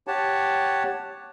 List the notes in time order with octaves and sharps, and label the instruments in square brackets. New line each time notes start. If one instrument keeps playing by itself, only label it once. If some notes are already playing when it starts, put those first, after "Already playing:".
[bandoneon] G4 C#5 F#5 A5